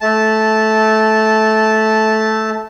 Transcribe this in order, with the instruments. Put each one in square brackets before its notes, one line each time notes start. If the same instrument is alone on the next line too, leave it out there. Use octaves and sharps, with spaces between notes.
[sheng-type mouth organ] A3 A5